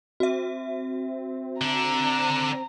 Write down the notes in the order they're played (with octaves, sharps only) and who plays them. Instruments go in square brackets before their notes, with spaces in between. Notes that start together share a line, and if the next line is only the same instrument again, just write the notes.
[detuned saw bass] C4 [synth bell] F#4 E5
[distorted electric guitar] D3 D4 [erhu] A#5